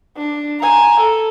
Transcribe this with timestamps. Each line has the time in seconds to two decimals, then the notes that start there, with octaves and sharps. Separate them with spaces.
0.17 D4
0.60 G#5 A#5
1.00 A4